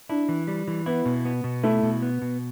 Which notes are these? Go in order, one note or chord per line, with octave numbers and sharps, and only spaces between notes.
D4 E4
E3
G3
E3
B3 E4
B2
B3
B2
A3 E4
B2
B3
B2